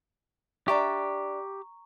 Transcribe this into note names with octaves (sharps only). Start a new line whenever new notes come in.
D4 G4 D5 E5 A#5 C#6